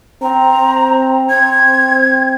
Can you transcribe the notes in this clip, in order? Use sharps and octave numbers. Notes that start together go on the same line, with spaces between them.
C4 A#5
C4 G#6